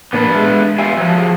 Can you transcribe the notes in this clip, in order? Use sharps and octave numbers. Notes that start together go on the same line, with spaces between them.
A2 E3 A#3 B3 D4 B4
G#3 E5 A6
E2 F4 G4 E5 G#5
F3 F#3
G4 G#4